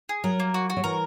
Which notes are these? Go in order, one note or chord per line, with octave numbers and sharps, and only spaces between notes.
G#4
F#3 A#4
A#3
F#4
F#4
F#3
E3 A#4